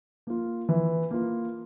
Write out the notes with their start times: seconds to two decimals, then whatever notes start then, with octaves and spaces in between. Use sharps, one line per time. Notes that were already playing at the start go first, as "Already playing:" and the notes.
0.27 A#3 F4
0.69 E3
1.11 A#3 F4